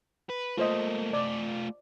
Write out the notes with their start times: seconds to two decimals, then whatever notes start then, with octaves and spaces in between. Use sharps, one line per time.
0.29 B4
0.57 A3 A#3 F4 C5 D#5
1.13 A3 F4 D5